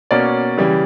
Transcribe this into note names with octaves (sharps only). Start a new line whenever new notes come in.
B2 A#3 C#4 D5
C#3 E3 G3